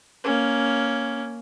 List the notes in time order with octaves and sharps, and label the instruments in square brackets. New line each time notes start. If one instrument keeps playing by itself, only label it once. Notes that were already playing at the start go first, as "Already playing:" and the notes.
[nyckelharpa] A#3 C#4